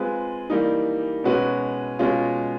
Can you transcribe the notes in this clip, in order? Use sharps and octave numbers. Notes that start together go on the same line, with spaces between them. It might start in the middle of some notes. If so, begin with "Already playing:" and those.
Already playing: G#3 C4 F4 G#4 B4
E3 G3 A#3 D#4
B2 G#3 C#4 F#4 B4
B2 G#3 C#4 F4